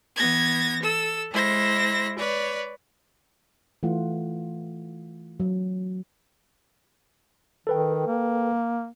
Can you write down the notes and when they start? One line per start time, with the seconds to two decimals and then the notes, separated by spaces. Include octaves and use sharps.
0.17 E3 B3 G#6 A#6
0.82 A4 E6
1.31 G#3 E4 C5 A#6
2.18 B4 C#5 D5
3.83 E3 A3 F4 F#5
5.40 F#3
7.67 D#3 A4 B4 G5
8.07 A#3